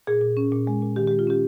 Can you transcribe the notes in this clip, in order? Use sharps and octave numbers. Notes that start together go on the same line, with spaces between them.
A#2 G#4
A#2
C#4
A#2
G#3
A#2
D#3 G4
G#3 G4
F4
C#4 G4